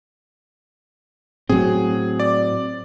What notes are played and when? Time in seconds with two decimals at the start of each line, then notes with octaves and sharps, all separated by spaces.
1.49 A2 F#3 C4 G#4
2.20 D5